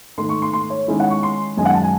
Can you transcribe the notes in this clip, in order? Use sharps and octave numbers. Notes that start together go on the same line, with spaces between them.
G#2 D#3 A3 D#4 C6
C#6
C6
C6
C#5
D#3 G#3 C#4 E4 A4
F#5
C#6
C6
F#2 D#3 G#3 D#4 G#5
F#5
A5
G#5